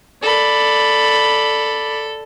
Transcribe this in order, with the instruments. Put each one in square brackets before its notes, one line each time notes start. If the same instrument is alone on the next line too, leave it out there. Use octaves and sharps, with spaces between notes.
[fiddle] A4 [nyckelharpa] D5 B5